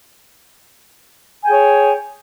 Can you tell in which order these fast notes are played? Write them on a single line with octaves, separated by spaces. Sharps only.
G#5 G5 G#4 C#5